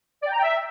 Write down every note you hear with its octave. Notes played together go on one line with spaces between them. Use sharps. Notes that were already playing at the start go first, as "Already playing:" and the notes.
D5
G5
A#5
G5
E5